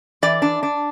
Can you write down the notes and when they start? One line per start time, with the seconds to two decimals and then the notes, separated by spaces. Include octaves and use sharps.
0.22 E3 D5
0.42 D4
0.63 D4